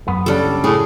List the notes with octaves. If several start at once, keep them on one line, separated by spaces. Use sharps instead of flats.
F#2 B3
C#3 G3 C#4 D4 A4
A2 G#4